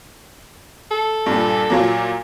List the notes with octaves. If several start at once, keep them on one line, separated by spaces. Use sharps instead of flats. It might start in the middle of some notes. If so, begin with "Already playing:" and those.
A4
G2 A#2
A#2 F#3 A#3